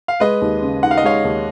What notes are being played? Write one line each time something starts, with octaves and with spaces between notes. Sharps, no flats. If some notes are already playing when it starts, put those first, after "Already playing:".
F5
G#3 B4 D#5
D#2
C#3
D#4 F#5
F5
D#5
G#3 C#5 F5
D#2